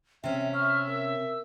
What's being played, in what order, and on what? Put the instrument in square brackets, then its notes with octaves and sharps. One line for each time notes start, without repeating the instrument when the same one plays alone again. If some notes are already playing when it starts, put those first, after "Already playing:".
[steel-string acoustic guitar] C3 C#4 [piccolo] E5 [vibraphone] G5
[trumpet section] E5 [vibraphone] C#6 [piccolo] F6
[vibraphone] C4 A#4 [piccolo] E6